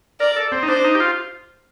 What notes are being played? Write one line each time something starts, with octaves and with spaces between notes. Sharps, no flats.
A#4 D5
A4
C4
D#4
D4 C5
D#4
G4
F4